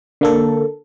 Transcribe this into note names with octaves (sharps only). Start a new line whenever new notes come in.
D3 A#3 A4